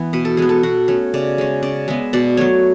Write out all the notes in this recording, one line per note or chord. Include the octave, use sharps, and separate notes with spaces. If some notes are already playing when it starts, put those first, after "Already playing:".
Already playing: E3 B3
B2 B4
A4
G#3 B3 G#4
A4
B2 F#4
A3 C#4
C#3 D5
G#3 C#4
C#3 D5
G#3 B3 E5
B2 D5
F#3 A3 C#5